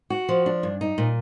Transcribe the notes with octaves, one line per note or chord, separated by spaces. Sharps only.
F#4
F3
D4
G2
D#4
A#2